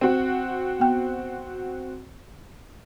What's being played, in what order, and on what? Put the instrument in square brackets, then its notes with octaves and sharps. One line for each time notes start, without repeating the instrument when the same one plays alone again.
[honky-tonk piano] C4 F#4
[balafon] B3 G5